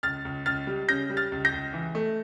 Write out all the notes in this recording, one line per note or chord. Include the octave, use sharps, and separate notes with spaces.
C#2 F6 A6
C#2
C#2 F6 A6
G3
C#3 G6 A#6
G3
F6 A6
C#2
G6 A#6
C#2
E3
A3